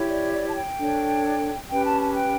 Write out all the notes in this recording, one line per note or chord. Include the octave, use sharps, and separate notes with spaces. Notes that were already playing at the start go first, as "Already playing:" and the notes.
Already playing: E4 G4 C#5
D5
D5
A5
G5
D4 A4 C#5
C#4 G4 B4 G5
A5
A5
G5